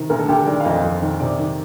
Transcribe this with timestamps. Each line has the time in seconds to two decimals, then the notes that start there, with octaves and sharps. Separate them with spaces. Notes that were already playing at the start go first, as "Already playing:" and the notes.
Already playing: C3 D#3
0.10 D2 A#4
0.19 A4
0.29 D2 G4
0.37 A4
0.47 D#3 D5
0.60 F5
0.65 F2 D#5
0.84 F2
1.02 D#3
1.20 C3 D5
1.39 D#3